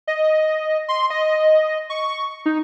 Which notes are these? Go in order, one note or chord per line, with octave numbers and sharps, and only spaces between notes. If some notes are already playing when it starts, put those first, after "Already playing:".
D#5
C6
D#5
C#6
D#4